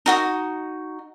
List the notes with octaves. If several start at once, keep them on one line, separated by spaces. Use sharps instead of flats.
D#4 F#4 D#6